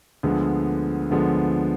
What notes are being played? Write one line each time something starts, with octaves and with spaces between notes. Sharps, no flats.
D2 D3 F3 G#3 B3
D2 D3 F3 G#3 B3